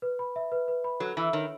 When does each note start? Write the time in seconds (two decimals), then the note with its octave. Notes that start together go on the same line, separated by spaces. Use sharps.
0.02 B4
0.19 B5
0.36 E5
0.52 B4
0.68 B4
0.84 B5
1.00 F#3 A4
1.17 E3 G#5
1.33 D#3 C#5